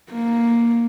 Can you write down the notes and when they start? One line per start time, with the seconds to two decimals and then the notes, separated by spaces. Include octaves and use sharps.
0.11 A#3